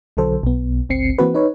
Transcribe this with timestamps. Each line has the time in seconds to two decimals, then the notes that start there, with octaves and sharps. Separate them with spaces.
0.17 B1 D3 F#3 A4 C5
0.43 B1 B3
0.89 G1 C#2 C4 C7 C#7
1.18 E3 A#3 C4 F#4 B4
1.34 D#4 B4 C#5